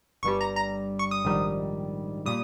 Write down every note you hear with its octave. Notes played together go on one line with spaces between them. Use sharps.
G1 G2 G3 C#6
A#5
A#5
C#6
D#6
A#1 G#2 D#3 G3
A#2 G3 D#6